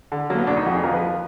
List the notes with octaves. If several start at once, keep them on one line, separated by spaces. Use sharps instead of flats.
D3
F#3 A#3
B3
D2 D4
D#4
F2 F#4
G#4
F3 A#4
B4
F3